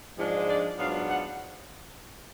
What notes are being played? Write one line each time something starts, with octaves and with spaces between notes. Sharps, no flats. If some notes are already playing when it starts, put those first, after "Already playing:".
G#2 F3 G#3 D4
D5
G#2 F#3 B3 D4 F4 F5
F#5